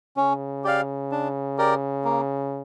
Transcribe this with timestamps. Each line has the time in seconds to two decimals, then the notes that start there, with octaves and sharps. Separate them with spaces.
0.17 C#3 C#4
0.64 G4 D5 F5
1.12 D4
1.58 G4 A#4 D5
2.05 A#3